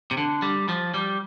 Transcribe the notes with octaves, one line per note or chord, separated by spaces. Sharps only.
C3
D3
G3
F3
G3